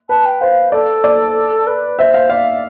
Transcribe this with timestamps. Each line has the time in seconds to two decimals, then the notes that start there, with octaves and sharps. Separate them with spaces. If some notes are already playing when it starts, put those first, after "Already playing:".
0.09 B4 A5
0.25 G5
0.41 C5 F5
0.72 A4 D5
1.04 D5
1.67 B4
1.99 C5 E5
2.14 F5
2.29 D5 F5